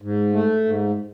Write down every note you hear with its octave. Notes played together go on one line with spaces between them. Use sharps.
G#2
A3
G#2